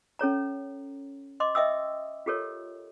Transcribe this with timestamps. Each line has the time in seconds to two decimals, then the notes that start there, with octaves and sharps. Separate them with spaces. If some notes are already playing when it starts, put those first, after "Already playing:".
0.19 C#4 A4 C#5 A#5
1.40 D#5 C6 D6
1.55 D#5 E5 G5 D#6 E6
2.26 F4 G4 A4 A#4 C#5